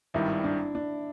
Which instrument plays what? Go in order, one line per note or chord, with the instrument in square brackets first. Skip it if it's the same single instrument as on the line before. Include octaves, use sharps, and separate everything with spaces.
[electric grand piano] G#1 G2 D#3 G3 [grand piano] E4
[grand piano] D4
D4